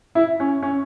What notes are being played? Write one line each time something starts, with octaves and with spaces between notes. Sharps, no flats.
E4
C#4
C#4